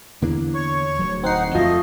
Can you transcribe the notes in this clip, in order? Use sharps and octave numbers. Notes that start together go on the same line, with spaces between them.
E2 D3 A#3 D4
C#5 C#6
D1 D2 F#3
C4 D#4 F#5 C7
F2 F3 A3 D#5